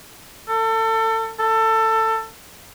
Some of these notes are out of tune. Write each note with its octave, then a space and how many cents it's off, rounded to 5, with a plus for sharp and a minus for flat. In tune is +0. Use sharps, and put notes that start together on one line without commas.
A4 +30
A4 +20